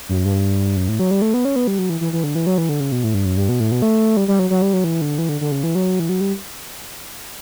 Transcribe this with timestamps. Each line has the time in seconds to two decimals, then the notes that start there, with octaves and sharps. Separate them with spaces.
0.09 F#2
0.25 G2
0.76 F#2
0.88 A2
0.99 F#3
1.11 G3
1.22 A3
1.34 B3
1.45 C#4
1.56 B3
1.67 G3
1.79 F#3
1.90 E3
2.01 E3
2.13 E3
2.24 D3
2.35 E3
2.47 F#3
2.58 E3
2.69 D3
2.80 C#3
2.92 B2
3.04 A2
3.14 G2
3.25 F#2
3.37 G2
3.49 B2
3.60 A2
3.71 B2
3.82 A3
4.17 G3
4.28 G3
4.39 F#3
4.50 F#3
4.62 G3
4.73 F#3
4.84 E3
5.01 D3
5.18 E3
5.29 D3
5.41 D3
5.52 C#3
5.63 E3
5.75 F#3
6.00 E3
6.09 F#3
6.21 G3